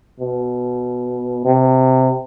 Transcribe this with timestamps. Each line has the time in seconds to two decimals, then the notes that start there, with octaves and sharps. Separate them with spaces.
0.20 B2
1.45 C3